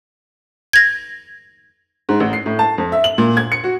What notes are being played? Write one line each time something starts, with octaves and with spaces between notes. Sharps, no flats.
G#6 A#6
G#2
A1
C7
A2
A5
F2
E5
F#7
A#2
G#6
C#7
F#4